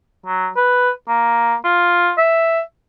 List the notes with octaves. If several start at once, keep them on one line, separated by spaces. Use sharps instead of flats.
F#3
B4
A#3
F4
E5